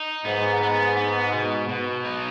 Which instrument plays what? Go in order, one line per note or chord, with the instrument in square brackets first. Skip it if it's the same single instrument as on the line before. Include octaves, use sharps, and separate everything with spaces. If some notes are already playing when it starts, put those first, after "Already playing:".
Already playing: [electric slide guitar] D#4
[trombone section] G#2 [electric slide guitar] B3
[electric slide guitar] B3
B3
B2
B2
D#4